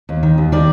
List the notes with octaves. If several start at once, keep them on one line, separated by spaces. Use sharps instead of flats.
D#2
D#3
D#2
D#3 D5